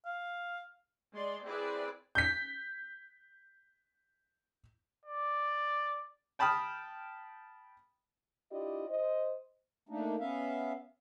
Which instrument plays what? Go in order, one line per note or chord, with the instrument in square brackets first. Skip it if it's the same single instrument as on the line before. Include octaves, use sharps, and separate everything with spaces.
[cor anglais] F5
[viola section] G#3 D5 C6
C4 E4 G#4 B4 D5
[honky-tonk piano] G6 B6
[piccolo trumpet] D5
[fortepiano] G5 A5 B5 D#6 F6
[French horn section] D4 E4 F4 G4 D5 D#5
C5 D#5
[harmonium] A3 A#3 D4 D#4
B3 C#4 E5 F5